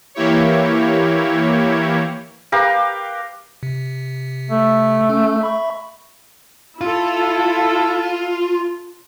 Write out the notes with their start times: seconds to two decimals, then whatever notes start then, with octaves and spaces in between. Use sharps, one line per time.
0.15 E3 A#3 E4 G4 C#5
2.52 G4 A#4 B4 F5
3.63 C3
4.51 A3
5.09 C#4
5.41 E5 B5 C#6
6.81 E4 F4 A4